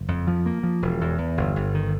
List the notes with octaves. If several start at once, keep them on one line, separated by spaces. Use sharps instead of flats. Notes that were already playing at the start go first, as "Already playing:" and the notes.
Already playing: F#1
F2
F3
A#3
F3
E1
E2
E2
G1
G1
D#3